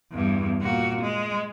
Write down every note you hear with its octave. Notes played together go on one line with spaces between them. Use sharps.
E2 G2
A#2 F#4
G#3